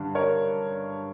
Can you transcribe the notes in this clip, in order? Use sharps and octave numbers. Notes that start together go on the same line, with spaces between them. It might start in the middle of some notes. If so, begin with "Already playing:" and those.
Already playing: G2 D3
A#4 C#5